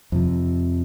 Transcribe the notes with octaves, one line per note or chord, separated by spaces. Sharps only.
F2 C3 F3